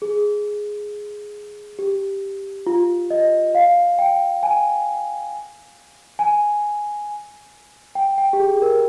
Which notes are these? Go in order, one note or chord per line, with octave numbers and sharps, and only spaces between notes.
G#4
G4
F4
D#5
F5
G5
G#5
G#5
G5
G5
G4
G#4
A#4